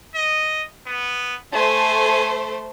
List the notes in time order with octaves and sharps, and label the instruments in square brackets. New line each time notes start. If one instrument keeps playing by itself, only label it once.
[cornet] D#5
B3
[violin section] A3 C5 [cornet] G#5